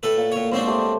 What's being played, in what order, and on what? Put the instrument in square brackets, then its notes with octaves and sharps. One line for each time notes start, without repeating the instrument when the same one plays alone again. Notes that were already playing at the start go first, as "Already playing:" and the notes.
[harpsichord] A2 A4 B4
[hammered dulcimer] A#2
[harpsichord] A2 C#5
[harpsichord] G#2 C4 D4 [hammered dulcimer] C5 C#5 C#6
[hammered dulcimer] A3 G4 C5